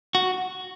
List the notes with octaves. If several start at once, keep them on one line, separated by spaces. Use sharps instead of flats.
F#4